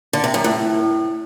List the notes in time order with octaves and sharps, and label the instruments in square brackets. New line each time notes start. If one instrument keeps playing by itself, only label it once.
[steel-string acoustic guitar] D3
C3
F#2
A2